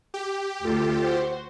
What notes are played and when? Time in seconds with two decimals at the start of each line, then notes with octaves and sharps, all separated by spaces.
0.14 G4
0.65 D2 F4 A4
1.02 F#4 C5